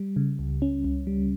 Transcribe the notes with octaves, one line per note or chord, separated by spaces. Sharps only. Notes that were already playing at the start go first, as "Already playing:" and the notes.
Already playing: G3
C#3
C#2
C#4
C#2
G3